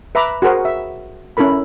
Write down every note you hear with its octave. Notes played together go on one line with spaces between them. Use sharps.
B4 E5 A#5 B5 D6
F#4 G#4 A#4 C5 F#5
E5
C#4 E4 A4 A#4 B5